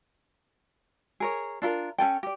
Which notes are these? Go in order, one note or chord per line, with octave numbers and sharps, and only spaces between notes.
G#4 A#4 C#5
D4 F4 A#4
C#4 F4 A4 G5
G4 D5